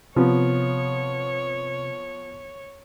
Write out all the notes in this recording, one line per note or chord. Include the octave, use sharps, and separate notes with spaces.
C3 F3 B3 C#5